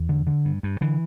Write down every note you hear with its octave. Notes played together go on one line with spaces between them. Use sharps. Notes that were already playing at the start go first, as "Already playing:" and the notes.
Already playing: E2
D3
D3
G2
G2
D3 E3